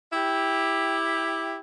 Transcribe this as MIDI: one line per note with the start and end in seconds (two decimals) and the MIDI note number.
0.12 1.59 64
0.12 1.59 67